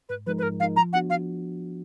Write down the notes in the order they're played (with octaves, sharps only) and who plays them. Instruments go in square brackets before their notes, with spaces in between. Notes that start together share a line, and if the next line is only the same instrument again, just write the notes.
[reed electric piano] G#2 [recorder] B4
[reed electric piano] F3 G#3 D#4 A#4 [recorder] B4
[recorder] B4
[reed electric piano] G#2 [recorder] A#4
[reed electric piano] F3 G#3 D#4 A#4 [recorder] F5
[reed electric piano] F3 [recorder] A#5
[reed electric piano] B3 D4 F#4 [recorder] F#5
[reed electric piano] F3 [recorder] F5